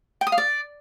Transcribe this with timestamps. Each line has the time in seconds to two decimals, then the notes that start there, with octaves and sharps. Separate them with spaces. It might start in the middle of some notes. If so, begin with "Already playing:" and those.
0.21 G5
0.27 D#6
0.32 F5
0.38 D5